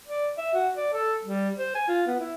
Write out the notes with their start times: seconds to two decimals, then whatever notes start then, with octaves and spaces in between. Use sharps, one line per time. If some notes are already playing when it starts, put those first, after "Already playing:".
0.08 D5
0.38 E5
0.54 F#4
0.77 D5
0.93 A4
1.25 G3
1.58 C5
1.75 G#5
1.88 F4
2.07 B3
2.19 E4